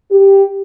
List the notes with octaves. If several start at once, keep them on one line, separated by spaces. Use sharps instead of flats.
G4